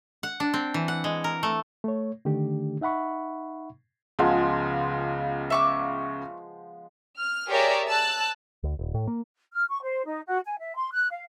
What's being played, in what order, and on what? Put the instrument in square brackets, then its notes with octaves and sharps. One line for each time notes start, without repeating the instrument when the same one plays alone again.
[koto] F#5
D4
C4
E3
F#5
G#3
A#4
A3
[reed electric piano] A3 C#5
D3 D#3 A3 D4 G4
D#4 E5 F#5 B5 C#6
[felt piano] C#2 C#3 [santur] F3 G#3 B3
[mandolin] E5 C#6 D6
[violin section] F6
G4 G#4 A#4 C#5 D5 E5
A5 E6 F#6
[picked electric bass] D2
D#1
A2
A#3
[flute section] F6
C#6
C5
D#4
F#4
G#5
E5
C6
F#6
F5